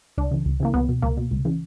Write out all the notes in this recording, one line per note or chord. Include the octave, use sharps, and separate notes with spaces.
C#2 D4
C#3 E3
C#2
C#3 E3 A#3
C#2 B3
B2
C#2 A#3
B2
C#2
C#3 E3